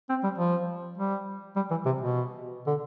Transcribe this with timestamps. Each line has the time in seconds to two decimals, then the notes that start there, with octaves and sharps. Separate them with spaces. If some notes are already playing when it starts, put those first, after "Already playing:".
0.09 C4
0.23 G3
0.38 F3
0.98 G3
1.56 G3
1.70 E3
1.86 C3
2.01 B2
2.67 D3